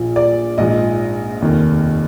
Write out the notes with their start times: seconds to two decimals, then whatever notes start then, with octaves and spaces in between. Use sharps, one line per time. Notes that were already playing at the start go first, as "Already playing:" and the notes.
Already playing: A#1 A#2 F3
0.16 D5
0.58 A#1 G#2 F3 D#5
1.41 F1 D#2 D#3